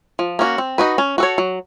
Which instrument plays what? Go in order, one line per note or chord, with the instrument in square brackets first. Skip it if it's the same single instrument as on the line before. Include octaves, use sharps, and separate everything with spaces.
[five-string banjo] F3
A#3 C#4 F#4
C4
D#4 F#4 B4
C#4
F#4 A4 C#5
F#3